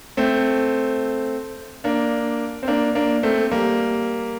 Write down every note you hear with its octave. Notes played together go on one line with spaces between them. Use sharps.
A3 C4
A#3 D4
C4
A#3 D4
A#3 D4
A3 C4
G3 A#3